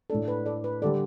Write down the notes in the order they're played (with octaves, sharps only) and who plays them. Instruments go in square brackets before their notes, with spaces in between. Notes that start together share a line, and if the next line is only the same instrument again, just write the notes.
[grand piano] A2 A3 D4 [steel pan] A4
[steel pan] B4
A4 D5
B4
[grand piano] D3 G3 [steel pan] A4 D5